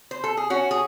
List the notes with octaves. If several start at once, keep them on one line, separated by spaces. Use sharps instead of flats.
C5
A4
G#4
C#4 F#4
G#4